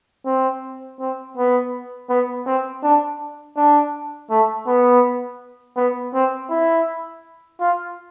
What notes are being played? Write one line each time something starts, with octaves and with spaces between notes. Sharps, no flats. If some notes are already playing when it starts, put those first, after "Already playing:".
C4
C4
B3
B3
C4
D4
D4
A3
B3
B3
C4
E4
F4